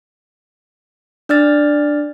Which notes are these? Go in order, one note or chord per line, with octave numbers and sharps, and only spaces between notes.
D4 D5 F6 A6